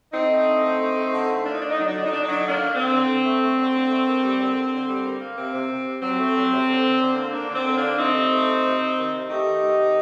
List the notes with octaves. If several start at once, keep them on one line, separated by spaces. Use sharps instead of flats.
D3 C4 D#4
A3
D3
A3
A3
A3
D3
A3
A#3 D4
D#4
D3 D4
D#4
F#3 D4
D#4
D3 D4
D#4
D3 D4
D#4
F#3 D4
D3 D#4
A#3 D4
D3
D3 C4
D3
D3
A3
A3
D3
D3
A3
A#3
G3
D3
D3
D3
G3
A#3
A#3
C3 C4
C3
C3
C3
F#3 C4
A3
F#3
C3
D3
D3
D3
A#3
D3 A#3 D4
D3 C4
D3
A#3 D4
D3
A3 C4 D#4
C3
A3
C3
C3
C3
D#3
C3
A3 D#4 G4
D#3
D#3
C3